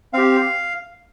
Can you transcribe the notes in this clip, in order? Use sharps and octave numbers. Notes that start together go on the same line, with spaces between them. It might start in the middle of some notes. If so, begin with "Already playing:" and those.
C4 G4 F5